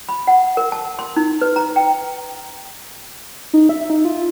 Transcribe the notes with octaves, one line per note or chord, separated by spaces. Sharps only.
B5
F#5
A#4
A5
C6
D#4
B4
A#5
G5
D#4
E5
D#4
F4